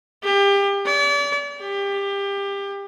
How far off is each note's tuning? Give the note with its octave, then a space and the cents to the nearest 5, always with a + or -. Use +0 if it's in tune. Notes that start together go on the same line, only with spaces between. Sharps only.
G4 +30
D5 -40
G4 +25